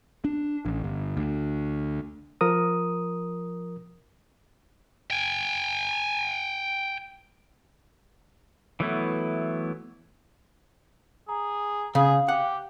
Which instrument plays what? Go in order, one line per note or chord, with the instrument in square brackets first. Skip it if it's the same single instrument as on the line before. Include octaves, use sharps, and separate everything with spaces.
[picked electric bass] D4
A1
G1
D2
[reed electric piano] F3 A#4 D#6
[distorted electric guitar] G5 G#5
[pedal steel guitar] E3 F#3 A3 B3 E4
[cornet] G#4 [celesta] A#5
[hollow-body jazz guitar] C#3 [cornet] G#4 [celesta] F5
[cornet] G4 [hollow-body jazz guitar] F#5